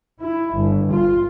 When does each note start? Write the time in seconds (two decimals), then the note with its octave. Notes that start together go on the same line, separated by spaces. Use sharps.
0.20 E4
0.54 G1
0.92 F4